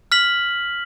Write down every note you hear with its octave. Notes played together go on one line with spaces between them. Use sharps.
F6 B6 F#7